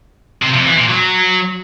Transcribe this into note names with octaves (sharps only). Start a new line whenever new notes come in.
C3
F2
E3
A#2
F#3